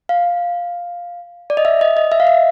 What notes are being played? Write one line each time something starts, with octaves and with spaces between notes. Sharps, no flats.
F5
D5
D#5
E5
D#5
D#5
E5
F5
E5